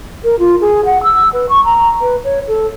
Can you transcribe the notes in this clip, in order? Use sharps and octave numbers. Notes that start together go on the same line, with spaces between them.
A#4
F4
G#4
F#5
E6
B4
C#6
A#5
B4
C#5
A4